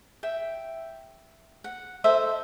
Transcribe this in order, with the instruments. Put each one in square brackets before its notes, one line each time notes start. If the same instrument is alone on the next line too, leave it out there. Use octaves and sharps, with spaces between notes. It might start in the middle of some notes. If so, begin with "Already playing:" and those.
[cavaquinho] E5 G5
F#5
D#4 A4 C5 E5